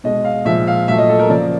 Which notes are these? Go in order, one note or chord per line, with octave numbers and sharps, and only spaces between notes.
B2 G#3 D#5
F5
A#2 F3 G#3 E5
F5
A#2 F#3 A3 E5
D#5
A4
A#4
C#3 F3 A#3 D5